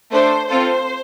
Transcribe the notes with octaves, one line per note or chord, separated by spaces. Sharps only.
A3 D4 A4 C5
C4 F4 A4 C5